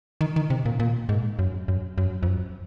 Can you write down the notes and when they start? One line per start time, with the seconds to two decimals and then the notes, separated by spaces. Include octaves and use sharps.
0.21 D#3
0.36 D#3
0.50 C3
0.66 A#2
0.80 A#2
1.09 G#2
1.39 F#2
1.68 F#2
1.98 F#2
2.23 F2
2.28 F#2